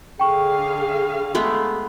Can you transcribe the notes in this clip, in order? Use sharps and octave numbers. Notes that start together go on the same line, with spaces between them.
D3 G#4 F5 G5 C#6
G#3 A3 B3